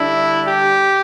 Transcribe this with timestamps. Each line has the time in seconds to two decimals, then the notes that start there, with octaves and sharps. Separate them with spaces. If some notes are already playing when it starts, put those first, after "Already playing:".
Already playing: D3 G3 D4 E4
0.46 G4